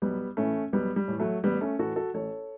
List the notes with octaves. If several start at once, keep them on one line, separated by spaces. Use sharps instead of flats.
B1 G3 B3
A2 E3 A3 C#4
B1 G3 B3
G3
A2 E3
F#3 A3
A1 G3 B3
A3 C#4
A2 E3 F#4 A4
F#4 A4
A1 A4 C#5